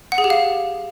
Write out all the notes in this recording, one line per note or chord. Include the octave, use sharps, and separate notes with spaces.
F#5
G#4
G4
F5